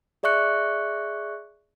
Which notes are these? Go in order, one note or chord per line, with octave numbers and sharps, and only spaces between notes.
G#4 D5 E5 C#6 F#6 C#7